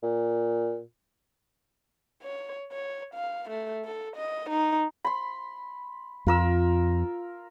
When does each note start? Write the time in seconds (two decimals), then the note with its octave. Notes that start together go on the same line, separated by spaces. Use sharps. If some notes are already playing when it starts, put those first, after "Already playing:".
0.03 A#2
2.22 C#5
2.72 C#5
3.14 F5
3.50 A3
3.85 A4
4.16 D#5
4.50 D#4
5.04 B5 C6
6.27 F2 F4 A#4 E6